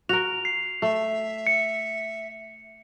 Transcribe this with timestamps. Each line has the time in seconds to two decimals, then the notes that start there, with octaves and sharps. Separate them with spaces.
0.09 F#4 A#4 F7
0.45 C7
0.82 A3 E5
1.47 C#7